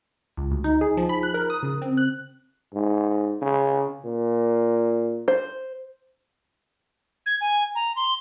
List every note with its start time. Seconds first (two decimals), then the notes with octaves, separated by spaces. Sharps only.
0.37 C#2
0.51 D2
0.64 D#4
0.81 G#4
0.97 F3
1.09 B5
1.23 F#6
1.34 A#4
1.50 D#6
1.63 C#3
1.82 C4
1.97 F#6
2.73 G#2
3.41 C#3
4.05 A#2
5.28 C5
7.26 G#6
7.41 G#5
7.75 A#5
7.96 C6